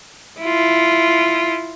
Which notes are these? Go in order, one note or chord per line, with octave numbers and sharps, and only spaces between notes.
E4 F4